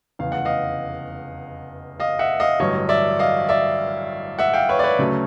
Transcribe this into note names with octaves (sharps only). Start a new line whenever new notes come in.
F1 E2 C#3 F5
F#5
D#5 F5
D#5 F5
E5 F#5
D#5 F5
A1 G2 D3 F#3 C#5 D#5
D5 E5
D#5 F5
D5 E5
E5 F#5
F5 G5
B4 C#5
D5
B4 C#5
D2 C#3 F#3 A3 C#4